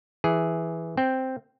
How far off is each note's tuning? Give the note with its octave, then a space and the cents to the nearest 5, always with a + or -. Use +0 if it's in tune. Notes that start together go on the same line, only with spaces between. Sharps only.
E3 +0 G#4 +0
C4 +0 G5 +0